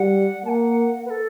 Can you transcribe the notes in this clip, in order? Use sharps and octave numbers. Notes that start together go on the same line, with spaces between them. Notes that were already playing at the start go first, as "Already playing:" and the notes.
Already playing: G3 F#5
A#3 F#5 A5
B4
A4